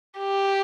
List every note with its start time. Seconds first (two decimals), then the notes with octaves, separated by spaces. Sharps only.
0.19 G4